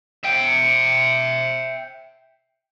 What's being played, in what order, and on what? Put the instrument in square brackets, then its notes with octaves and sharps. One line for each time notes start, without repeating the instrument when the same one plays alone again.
[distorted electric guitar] E5 G5